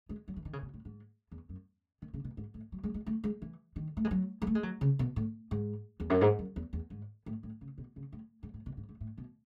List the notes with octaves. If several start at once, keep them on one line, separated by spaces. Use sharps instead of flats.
G#3
F#3
E3
D#3
C#3
B2
A2
G#2
E2
F#2
D#3
C#3
B2
G#2
A2
F#3
G#3
G#3
A3
G#3
E3
D#3
A3
G#3
F#3
G#3
A3
G#3
F#3
C#3
B2
A2
G#2
E2
F#2
G#2
F#2
E2
E2
G#2
A2
A2
C#3
B2
C#3
A2
G#2
A2
B2
G#2
G#2
A2
B2